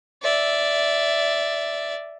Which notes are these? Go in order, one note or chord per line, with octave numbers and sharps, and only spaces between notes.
D5 E5